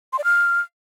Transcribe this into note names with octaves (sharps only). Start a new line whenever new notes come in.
C6
D5
F6